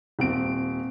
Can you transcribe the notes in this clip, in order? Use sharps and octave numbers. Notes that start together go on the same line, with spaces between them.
D#1 C4 D7